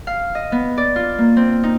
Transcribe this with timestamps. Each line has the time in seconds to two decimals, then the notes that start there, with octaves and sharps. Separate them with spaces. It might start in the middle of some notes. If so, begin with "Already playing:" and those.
0.07 F5
0.35 D#5
0.52 B3
0.77 D5
0.96 F4
1.18 A#3
1.37 C4
1.63 D#4